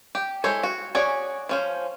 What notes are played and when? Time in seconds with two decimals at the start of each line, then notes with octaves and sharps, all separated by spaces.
0.15 G4
0.44 G#3 E4 A4 C5 C#5
0.63 F#4
0.95 C#4 F#4 G#4 C#5 D5
1.49 F3 C#4 C5